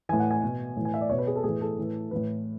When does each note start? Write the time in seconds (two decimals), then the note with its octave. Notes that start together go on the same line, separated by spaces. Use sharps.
0.09 A2 E3 G#5
0.20 F#5
0.31 G#5
0.43 B2
0.76 A2 E3
0.85 G#5
0.94 E5
1.01 D5
1.10 B2 C#5
1.18 B4
1.27 G#4
1.36 A4
1.43 A2 E3 G#4
1.61 A4
1.78 A2 E3
2.11 A2 E3 B4